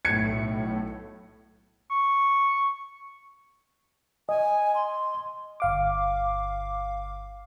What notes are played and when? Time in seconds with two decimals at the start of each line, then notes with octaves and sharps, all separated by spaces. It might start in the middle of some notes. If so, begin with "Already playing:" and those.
0.05 B1 A2 G#6 C#7
1.91 C#6
4.29 D#5 G#5
4.74 C6
5.60 G1 F5 D6